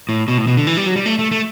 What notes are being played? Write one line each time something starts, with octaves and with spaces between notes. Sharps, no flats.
A2
B2
A2
B2
D3
E3
G3
F#3
G3
A3
A3
A3